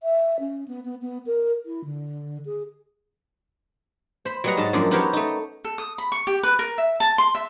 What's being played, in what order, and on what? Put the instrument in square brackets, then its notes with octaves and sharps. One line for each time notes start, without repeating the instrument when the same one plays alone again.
[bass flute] E5
C#4
B3
B3
B3
A#4
E4
D3
G#4
[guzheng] C5 B5
F#3 G3 B3 D#5 F#5 A#5
G#2 D#5 A5
F#2 F3 G#3 A#3 D4
B3 D#4 G4 A#4 C5 C#5
A3 D#4
[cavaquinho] A4
D#6
B5
C#6
G4
B4
A#4
E5
A5
C6
E5